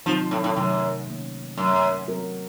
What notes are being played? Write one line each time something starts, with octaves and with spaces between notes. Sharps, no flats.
C3 D#3 F3 F#3 C4 D#4
A2
A2
F#2 C3 D#3 A3
C3 D#3 A#3 C#4
F#2 F#3 A3 C#4
F#3 C4 F#4 A#4